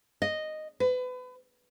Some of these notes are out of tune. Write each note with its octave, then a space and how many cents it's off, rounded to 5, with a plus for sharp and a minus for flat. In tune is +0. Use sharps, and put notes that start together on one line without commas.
D#5 -5
B4 +30